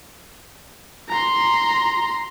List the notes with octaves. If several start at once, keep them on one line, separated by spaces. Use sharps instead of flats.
A#5 C6